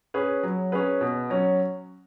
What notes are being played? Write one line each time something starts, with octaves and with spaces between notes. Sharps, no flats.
C#4 G#4 B4
F#3
C#4 G#4 B4
B2
F#3 C#4